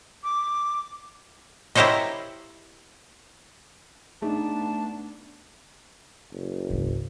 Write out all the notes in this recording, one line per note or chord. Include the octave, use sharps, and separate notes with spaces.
D6
E4 G4 A#4 C5 C#5 D#5
A3 B3 D4 D#4 G#4 A5
F#1
G#1 C#2